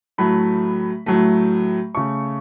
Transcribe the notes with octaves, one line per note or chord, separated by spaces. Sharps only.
A2 F#3 A3 B5
A2 F#3 A3
C#3 A3 C#6